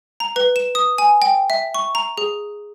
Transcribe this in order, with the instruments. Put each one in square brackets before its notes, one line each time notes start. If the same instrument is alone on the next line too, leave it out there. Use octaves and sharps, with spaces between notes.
[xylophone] A#5
B4
E7
D#6
G#5
G5
E5
C#6
A#5
G#4